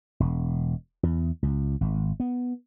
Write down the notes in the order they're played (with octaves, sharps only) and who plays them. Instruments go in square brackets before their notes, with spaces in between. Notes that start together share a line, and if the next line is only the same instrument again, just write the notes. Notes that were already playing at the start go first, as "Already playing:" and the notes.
[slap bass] E1
E2
C#2
G#1
B3